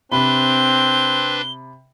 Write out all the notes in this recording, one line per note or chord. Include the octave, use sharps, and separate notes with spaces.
C3 C4 D4 B4 B5 G7